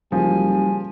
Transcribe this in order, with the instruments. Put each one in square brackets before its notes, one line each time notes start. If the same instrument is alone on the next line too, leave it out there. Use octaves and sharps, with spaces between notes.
[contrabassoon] F#1 [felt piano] F3 [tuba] G3 [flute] G#5